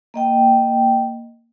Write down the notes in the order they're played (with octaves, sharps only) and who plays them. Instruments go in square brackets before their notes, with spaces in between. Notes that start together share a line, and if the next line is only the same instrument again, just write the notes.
[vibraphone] A#3 D#5 G5